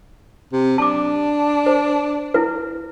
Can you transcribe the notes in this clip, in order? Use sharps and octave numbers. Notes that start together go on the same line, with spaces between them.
C3
D4 A5 D6
C5
E4 B4